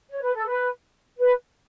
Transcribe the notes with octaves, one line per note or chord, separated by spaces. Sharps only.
C#5
B4
A4
B4
B4